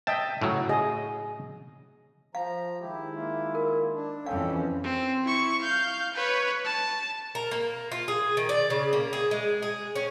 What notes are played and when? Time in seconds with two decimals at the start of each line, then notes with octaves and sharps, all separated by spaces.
0.07 D#5 E5 G5 A5
0.41 A2 C#3 F#3
0.69 G#4 D#5
2.35 F3 F5 A#5
2.80 D#3 G#3 E4 G4
3.15 A#3 F4
3.55 A#4
3.94 D4
4.26 F2 E3 C#4 A4 F5 G5
4.84 C4
5.24 E4 C#6
5.61 F5 G6
6.14 B4 C#5
6.65 A5
7.35 A#4
7.51 A#3
7.92 F4
8.08 G#4
8.37 D#3
8.49 D5
8.70 C#3
8.93 A#3
9.13 G#4
9.31 G#3
9.62 G#4
9.96 C#4